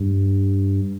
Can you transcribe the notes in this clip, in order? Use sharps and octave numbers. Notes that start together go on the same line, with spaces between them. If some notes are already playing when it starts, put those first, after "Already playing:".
Already playing: G2